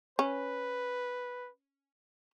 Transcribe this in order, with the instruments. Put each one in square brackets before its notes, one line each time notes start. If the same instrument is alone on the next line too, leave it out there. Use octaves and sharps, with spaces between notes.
[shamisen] C#4 [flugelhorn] B4